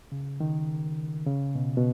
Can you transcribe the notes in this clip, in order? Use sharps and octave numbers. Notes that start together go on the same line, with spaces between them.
C#3
D#3
C#3
B2
B2